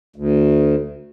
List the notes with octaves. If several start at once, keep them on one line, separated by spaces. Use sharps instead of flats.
D2